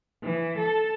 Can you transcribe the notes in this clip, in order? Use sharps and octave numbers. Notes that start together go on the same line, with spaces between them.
E3
A4